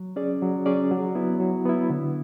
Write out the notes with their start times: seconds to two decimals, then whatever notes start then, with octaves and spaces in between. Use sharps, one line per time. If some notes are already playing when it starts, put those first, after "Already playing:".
Already playing: F#3
0.16 C#4 G#4 D5
0.42 F#3
0.66 C#4 G#4 D5
0.91 F#3
1.15 B3 E4
1.40 F#3
1.65 B3 E4
1.90 D3